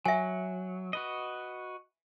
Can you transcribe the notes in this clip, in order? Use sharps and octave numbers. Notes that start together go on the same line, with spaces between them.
F#3 E5 G#5
F#4 B4 D#5